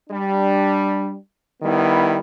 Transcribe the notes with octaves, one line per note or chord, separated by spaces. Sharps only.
G3 D4
D#3 G3 B3 E4